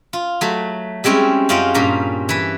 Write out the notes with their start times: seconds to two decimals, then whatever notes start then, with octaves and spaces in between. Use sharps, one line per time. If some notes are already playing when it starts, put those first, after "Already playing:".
0.13 F4
0.41 F#3 A3
1.04 G3 G#3 C4 C#4 E4
1.49 F#2 C#4 F4 D#5 F#5 G5
1.74 G2 A#2 C#4 A#5
2.29 E3 B4